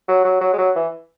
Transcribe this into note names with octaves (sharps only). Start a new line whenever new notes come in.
F#3
F#3
F#3
G#3
F#3
E3